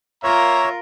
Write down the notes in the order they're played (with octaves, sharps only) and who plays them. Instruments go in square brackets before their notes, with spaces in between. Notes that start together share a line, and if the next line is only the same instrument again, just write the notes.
[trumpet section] A#3 E5 A#5 [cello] F4 A#4 [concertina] C#5